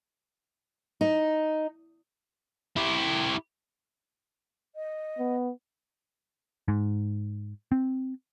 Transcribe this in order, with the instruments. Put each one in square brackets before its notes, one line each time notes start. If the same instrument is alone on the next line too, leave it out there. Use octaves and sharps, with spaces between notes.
[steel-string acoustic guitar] D#4
[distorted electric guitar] E4 G4
[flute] D#5
[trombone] B3
[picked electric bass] G#2
C4